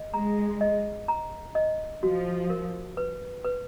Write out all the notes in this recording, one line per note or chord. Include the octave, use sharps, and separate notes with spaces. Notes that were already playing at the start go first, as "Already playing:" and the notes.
Already playing: D#5
G#3 A#5
D#5
A#5
D#5
F3 F#4
A#4
B4
B4